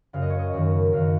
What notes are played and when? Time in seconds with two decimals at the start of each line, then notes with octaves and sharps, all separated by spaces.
0.13 F#2 C#3 F5
0.22 D#5
0.30 C#5
0.39 D#5
0.53 F#2 D#3
0.93 F#2 D#3 F5